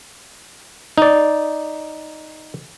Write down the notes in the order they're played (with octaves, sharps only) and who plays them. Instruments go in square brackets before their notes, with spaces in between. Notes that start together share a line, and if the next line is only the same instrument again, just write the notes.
[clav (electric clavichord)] D#4 D5